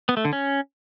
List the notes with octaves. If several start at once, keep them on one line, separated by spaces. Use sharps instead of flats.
B3
A3
D3
C#4